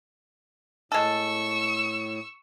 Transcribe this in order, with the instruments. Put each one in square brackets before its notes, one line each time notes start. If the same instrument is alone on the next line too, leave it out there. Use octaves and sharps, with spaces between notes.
[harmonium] A2 [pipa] G#3 A4 [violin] C#6 E6